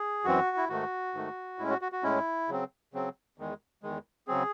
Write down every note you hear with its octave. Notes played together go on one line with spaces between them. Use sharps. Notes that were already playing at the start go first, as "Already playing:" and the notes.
Already playing: G#4
F#2 E3 C4 F#4
E4
G#2 D#3 A3 F#4
G#2 D#3 A3
A2 G#3 C#4 E4
F#4
F#4
F#4
A2 G#3 C#4 E4
C#3 F#3 C4
C#3 F#3 C4
E2 D#3 G#3
E2 D#3 G#3
C#3 F#3 C4 G#4